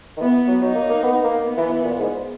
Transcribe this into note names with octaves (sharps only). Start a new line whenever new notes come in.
D#3
E3 B3
F#3
F#3 D#4
A#3
A#3
B3
A#3
B3
E3
E3
A#2
G#2